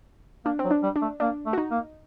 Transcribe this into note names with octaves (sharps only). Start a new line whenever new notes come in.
A#3 D4
C4
F#3
D4
G3
D4
A3
A#3 D4
A3
F#4
D#4
A#3